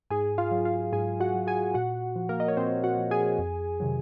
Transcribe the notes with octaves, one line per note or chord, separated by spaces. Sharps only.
G#2 G#4 G#5
F4 F5
F#3
F4 F5
G#2 G#4 G#5
F#4 F#5
F#3
G#4 G#5
A#2 F#4 F#5
F3
A#3 A#4
D#5
C#5
A#2 C4 C5
F#4 F#5
F3
G#4 G#5
F2
C3 D#3 F#3